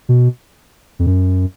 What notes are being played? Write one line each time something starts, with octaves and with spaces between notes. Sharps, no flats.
B2
F2
F#2